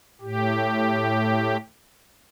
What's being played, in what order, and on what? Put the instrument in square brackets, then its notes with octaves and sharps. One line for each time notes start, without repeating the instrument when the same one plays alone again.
[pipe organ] A2 G4